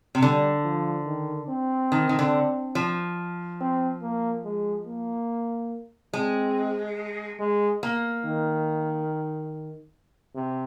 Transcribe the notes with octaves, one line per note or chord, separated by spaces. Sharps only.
C3
D3 G3
F3
D#3
C4
D#3
D#3
D3
F3
C4
A#3
G#3
A#3
G#3 C4
G#3
A#3
D#3
C3